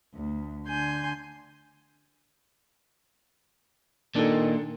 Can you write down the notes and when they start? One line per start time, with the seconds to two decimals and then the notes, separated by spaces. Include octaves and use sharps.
0.13 D2
0.68 D3 G#5 C6 G6
4.16 A#2 D#3 D4 A4